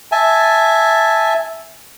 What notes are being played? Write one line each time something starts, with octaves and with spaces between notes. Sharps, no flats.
E5 G#5 A5